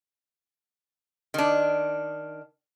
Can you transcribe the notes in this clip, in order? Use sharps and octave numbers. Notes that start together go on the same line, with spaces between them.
D#3 D4